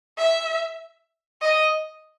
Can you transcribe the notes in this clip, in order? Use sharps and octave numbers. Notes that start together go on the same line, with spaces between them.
E5
D#5